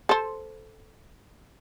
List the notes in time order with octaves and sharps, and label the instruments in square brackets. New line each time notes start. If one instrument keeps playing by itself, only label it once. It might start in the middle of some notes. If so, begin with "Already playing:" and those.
[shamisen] A4 C5